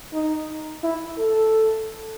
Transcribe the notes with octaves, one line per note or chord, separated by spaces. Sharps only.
D#4
E4
A4